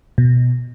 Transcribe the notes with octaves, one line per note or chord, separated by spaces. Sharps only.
B2